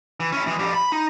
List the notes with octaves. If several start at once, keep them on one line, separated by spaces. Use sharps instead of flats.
E3
C#4 E4
E3 G#3
F2 G3
B5
D#4